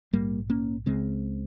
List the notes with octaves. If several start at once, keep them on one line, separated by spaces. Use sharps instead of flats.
A#1 G#2 G3 A#3
A#3 C#4
C#2 C#3 G#3 C4